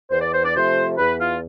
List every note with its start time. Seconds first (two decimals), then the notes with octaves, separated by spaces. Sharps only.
0.11 E2 C5
0.22 D5
0.34 C5
0.45 D5
0.54 C3 F3 A3 C5
0.98 E2 B4
1.21 F4